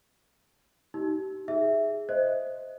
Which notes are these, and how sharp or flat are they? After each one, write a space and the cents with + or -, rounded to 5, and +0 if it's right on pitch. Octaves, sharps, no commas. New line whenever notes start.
D#4 +20 G4 -30
G#4 +0 E5 +0
C5 +0 D#5 +0